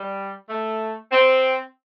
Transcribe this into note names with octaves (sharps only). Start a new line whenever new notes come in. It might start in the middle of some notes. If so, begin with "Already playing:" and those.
Already playing: G3
A3
C4